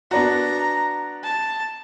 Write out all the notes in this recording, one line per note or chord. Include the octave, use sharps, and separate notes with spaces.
B3 D4 F#4 A#5
A5